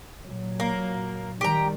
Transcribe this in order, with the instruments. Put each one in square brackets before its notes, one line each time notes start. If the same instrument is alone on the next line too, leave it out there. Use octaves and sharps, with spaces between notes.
[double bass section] A#2 F#3
[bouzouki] A#3
[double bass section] D#3 G3 [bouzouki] G4 A#5